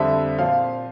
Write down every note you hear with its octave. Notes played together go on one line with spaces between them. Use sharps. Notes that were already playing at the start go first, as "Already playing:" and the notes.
Already playing: F2 D3 G3 E5
A#2 F3 C4 F4 F5